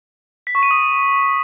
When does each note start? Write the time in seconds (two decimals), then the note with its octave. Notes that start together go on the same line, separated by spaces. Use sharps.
0.47 B6
0.55 C#6
0.63 D#7
0.71 D#6